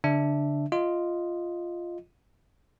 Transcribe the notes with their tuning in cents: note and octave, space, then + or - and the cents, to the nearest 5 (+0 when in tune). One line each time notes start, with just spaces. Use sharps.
D3 -40 D4 +0 E5 +0
F4 -5 D#5 +0